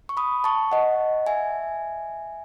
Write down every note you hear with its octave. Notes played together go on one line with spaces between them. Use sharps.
C#6
B5 D#6
A5 C#6
D#5 F#5
E5 G#5